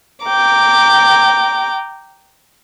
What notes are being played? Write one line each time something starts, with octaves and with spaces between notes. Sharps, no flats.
G5 A#5 D6